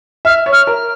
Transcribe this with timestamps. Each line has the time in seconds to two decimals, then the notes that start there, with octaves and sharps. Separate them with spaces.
0.25 E5 F6
0.46 C#5
0.53 F6
0.67 A#4